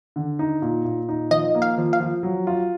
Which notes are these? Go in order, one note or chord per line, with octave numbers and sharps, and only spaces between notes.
D3
D#4
A#2
A#2
D#4
F3 D#5
A#3
F5
F3
F5
F3
F#3
F4